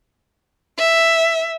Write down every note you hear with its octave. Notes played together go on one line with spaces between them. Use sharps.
E5